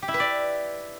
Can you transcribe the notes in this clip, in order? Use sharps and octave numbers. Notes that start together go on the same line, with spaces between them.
G4
E4
B4
D5